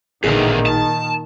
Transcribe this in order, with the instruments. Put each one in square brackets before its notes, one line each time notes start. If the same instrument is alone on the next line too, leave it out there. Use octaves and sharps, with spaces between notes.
[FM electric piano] A1 G#4 [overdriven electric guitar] E2 D3 [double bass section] A#2 D#3
[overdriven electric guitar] A5